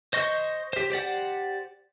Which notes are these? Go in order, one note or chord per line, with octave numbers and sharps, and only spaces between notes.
C5 D#5 C#6 G6
G4 C5
G4 C5 D5 F#5